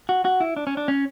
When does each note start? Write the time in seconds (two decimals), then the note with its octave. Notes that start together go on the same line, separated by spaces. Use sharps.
0.09 F#4
0.25 F#4
0.40 E4
0.56 D4
0.67 C#4
0.77 D4
0.88 C#4